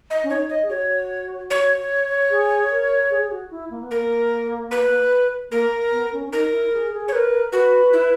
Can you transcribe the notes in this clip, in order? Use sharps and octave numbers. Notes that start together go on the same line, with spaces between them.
D#5
C#4
D#4 C#5
D#5
G#4
F#4 C#5
C#5
G#4
A#4
G#4
G#4
F#4
E4
A#3
B3
A#3 A#4
B4
A#3 A#4
B3
C#4
C#4
D#4 A#4
E4
G#4
G#4
C#5
A#4 B4
F#4 B4
E4